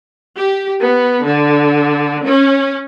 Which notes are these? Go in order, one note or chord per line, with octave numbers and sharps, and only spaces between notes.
G4
B3
D3
C#4